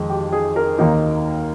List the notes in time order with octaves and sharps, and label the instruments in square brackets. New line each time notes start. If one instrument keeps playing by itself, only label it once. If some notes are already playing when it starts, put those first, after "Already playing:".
Already playing: [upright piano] F2 D#3 G#3
G4
G#4
A#4
D#2 D#3 A#3 D#4